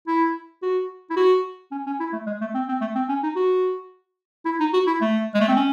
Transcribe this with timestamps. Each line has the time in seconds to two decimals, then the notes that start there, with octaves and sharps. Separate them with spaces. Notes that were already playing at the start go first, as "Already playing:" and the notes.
0.07 E4
0.63 F#4
1.10 E4
1.17 F#4
1.71 C#4
1.86 C#4
2.00 E4
2.13 A3
2.26 G#3
2.41 A3
2.54 C4
2.68 C4
2.81 A3
2.95 C4
3.09 C#4
3.23 D#4
3.36 F#4
4.45 E4
4.60 D#4
4.73 F#4
4.87 E4
5.01 A3
5.34 G#3
5.41 A3
5.49 C4
5.56 C#4